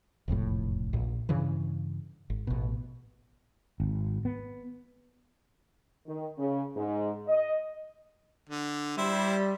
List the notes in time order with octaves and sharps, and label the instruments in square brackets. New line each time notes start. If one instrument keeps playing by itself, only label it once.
[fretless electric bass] E1 C2 F2 A2
A#1 A#2
G2 C#3 E3
G#1
A1 B2
G#1
B3
[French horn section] D#3
C#3
G#2
D#5
[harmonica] D3
[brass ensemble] G3 [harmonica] E4 C5